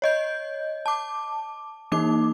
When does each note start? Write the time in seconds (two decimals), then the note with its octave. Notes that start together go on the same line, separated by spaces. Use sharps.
0.02 C#5 D#5 G6
0.86 A5 D6
1.92 E3 A#3 D#4 D6